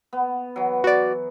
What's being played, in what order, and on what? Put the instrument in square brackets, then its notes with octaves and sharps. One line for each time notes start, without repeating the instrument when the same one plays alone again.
[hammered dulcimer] B3
E3 F#3
[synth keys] F#4 D5